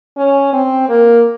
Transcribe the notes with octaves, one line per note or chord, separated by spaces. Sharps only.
C#4
C4
A#3